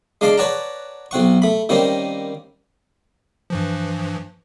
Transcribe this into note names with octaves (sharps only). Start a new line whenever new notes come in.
G#3 D4 F5 A5 D6
B4 C#5 D5 F#5 A5 A#5
B1 C4 F#5 C#6
A3 B5
D#3 G3 A#3 C4 C#4
G2 E3 F3